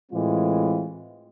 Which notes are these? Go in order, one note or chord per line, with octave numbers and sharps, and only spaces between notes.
A2 E3 G#3 C4 F4